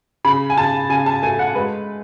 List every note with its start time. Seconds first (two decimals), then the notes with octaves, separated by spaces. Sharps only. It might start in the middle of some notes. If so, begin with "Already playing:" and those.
0.25 C#3 B5
0.50 G#5
0.58 C#3 A5
0.90 C#3 G#5
1.06 A5
1.23 A3 G#5
1.39 F#5
1.55 G#3 B4